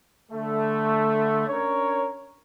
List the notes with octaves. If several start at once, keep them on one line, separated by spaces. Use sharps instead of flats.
D3 A3
C#4 D4 A#4 C#5